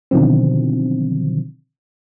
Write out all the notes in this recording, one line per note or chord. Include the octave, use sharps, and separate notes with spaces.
B2 D3 D#3 F3 F#3 C4